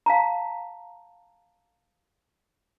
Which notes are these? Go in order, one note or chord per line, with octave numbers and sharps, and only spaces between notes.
F5 A5 A#5